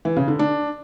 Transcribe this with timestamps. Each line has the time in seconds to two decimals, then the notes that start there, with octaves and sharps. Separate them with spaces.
0.05 E3
0.16 C#3
0.28 D3
0.39 D4